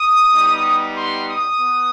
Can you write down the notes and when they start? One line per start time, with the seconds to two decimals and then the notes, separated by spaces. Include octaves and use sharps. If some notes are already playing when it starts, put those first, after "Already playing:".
Already playing: D#6
0.33 G3 B3 D#4 G4
0.97 C6
1.29 D#6
1.60 B3